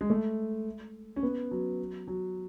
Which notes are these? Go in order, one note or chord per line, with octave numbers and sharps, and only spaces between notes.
G#3
A3
C#4
B3
F#3
F#3